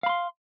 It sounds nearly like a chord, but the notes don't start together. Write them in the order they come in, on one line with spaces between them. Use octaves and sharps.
F5 B5 C6